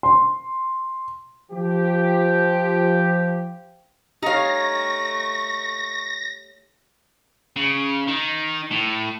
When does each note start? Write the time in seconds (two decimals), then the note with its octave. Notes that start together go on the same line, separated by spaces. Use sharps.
0.03 C6
1.52 F3 G4
4.23 A3 D#4 G4 C#5 F5 C#6 A#6
7.57 C#3
8.08 D#3
8.71 A2